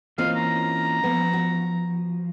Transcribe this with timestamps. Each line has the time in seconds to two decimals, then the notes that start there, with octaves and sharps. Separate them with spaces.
0.18 E3 A#3 C4 C#4 F4 D#5 F5
0.36 A#5
1.04 F3 B3
1.33 F#4